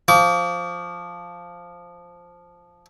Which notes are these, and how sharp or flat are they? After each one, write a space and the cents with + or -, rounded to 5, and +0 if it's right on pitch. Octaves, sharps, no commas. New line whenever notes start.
F3 +0 D6 -40